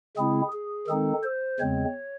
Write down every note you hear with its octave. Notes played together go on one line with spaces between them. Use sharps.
C#3 G#3 C4 E4 G#4
G#4
D#3 G#3 C4 D#4 A4
C5
E2 C#3 G#3 C4 C#5